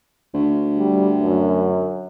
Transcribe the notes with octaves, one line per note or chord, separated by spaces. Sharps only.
D2
G3
F#2